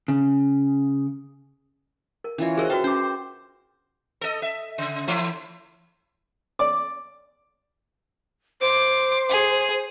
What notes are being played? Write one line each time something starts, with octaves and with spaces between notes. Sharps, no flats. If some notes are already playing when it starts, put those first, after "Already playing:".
C#3
A#4
E3 C#4 F4 C#5 E5
F#4 G#4 A#4 C5 D#5
F#4 B4 G5 A5 C6
C#4 C5 D6
A4 D#5
E5
C#3
E3 A3 E4
D5
C5 D6
G#4